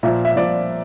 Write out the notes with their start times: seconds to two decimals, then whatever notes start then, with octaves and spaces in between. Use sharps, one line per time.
0.03 A#2 F3 E5
0.25 E5
0.36 A#2 F3 D5